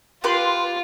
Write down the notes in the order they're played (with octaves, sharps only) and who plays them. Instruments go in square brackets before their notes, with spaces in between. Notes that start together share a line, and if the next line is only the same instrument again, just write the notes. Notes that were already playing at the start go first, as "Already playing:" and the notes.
[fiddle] F4 [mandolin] G4 B4 C6